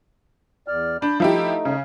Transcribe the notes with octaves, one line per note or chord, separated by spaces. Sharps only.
E2 D5 F6
D4 B5 G6
F3 A3 D#4 E4 G4
C#3